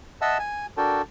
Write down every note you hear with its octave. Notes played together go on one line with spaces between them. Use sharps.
D#5 E5 F#5 A5 E6
G#5
D4 F#4 A4 A#4 G5 A5